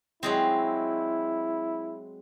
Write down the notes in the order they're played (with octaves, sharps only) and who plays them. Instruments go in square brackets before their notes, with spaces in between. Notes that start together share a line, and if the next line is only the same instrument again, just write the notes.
[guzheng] F#3 G#3 C4 [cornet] E4